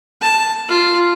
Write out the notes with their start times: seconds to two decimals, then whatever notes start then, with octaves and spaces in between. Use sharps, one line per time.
0.22 A5
0.69 F4